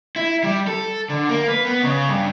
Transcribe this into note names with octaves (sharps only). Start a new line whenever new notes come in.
E4
G3
A4
D3
A#3
B4
B3
C#3
G2